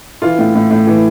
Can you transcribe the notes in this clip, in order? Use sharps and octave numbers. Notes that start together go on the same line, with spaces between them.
E3 F4
A2
A2
A2
E3